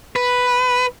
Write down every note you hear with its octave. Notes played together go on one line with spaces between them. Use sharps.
B4